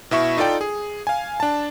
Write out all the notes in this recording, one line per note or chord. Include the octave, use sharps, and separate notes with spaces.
B2 E4 E5 C#6
D#4 F4 A4 D5 G5
G#4
F5 G#5
D4 A5